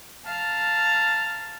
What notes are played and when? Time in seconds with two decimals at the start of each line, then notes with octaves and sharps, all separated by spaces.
0.25 F5 A5 A#5 F6